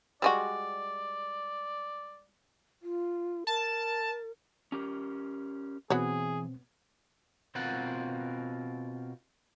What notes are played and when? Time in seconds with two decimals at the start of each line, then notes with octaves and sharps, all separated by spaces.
0.22 G3 G#3 F#4 D5
2.82 F4
3.47 A#4 A5
4.72 C#4 G4 A#4
5.90 B2 E3 B3 C4 F#4 G#4 C#5
7.55 B2 C4 F4 A#4 F#5